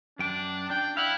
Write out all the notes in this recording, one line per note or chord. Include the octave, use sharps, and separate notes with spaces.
F#2 D4 G5
D4 G5
E4 F5 F#5